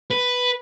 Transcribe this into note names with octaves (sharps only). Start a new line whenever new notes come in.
B4